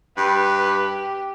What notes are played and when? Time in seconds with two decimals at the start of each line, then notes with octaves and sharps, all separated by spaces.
0.17 G2 G4 B4